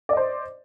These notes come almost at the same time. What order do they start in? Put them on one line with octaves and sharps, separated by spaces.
D5 D#5 C5